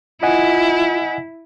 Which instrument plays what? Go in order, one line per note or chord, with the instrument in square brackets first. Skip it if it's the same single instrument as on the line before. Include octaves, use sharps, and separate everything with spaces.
[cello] E4 [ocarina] F4 [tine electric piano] D#5 F#5 G#5